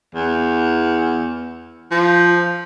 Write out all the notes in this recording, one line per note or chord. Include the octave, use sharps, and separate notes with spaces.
E2
F3